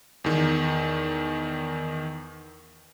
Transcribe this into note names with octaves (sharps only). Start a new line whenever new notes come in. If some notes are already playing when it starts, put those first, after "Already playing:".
E2 D#3